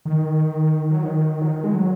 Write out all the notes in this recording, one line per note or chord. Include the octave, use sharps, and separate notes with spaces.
D#3
F#3
D#3
F#3
D#3
G#3
F#3